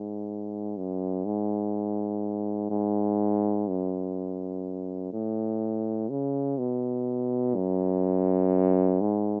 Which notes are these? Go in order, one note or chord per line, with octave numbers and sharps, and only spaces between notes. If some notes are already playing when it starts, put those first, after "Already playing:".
Already playing: G#2
F#2
G#2
G#2
F#2
A2
C#3
B2
F#2
G#2